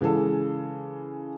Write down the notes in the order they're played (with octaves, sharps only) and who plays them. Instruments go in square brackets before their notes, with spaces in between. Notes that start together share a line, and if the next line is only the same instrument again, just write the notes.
[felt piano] C#3 E3 G#3 G#4 A4